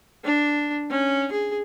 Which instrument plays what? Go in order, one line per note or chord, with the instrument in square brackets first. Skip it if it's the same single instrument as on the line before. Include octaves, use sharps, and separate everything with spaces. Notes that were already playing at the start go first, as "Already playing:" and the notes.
[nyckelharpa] D4
C#4
G#4